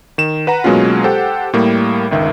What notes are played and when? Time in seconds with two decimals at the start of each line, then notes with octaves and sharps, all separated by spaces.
0.18 D#3 E7
0.47 B4 F#5 A#5
0.64 B2 F#3 G#3 A#3 C#4 F4
1.04 G4 A4 C5 F#5 G5
1.53 A2 G3 A#3
2.11 G1 C#2 D#3 E5